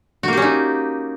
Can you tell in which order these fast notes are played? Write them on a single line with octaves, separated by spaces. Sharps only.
F#4 A#3 G4 C#4 D#4